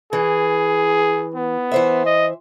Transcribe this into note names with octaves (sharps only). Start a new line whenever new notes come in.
E3 G#4
B3
E3 C5 E5
D#5